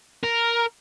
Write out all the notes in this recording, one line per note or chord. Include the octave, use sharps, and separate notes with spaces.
A#4